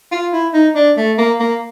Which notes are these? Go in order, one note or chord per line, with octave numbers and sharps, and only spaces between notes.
F4
E4
D#4
D4
A3
A#3
A#3